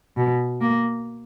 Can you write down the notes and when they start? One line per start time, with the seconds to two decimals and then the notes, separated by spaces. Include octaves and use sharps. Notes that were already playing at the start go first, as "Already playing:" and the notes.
0.17 B2
0.61 A#3